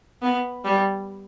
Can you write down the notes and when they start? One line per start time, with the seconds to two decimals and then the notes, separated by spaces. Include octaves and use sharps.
0.22 B3
0.65 G3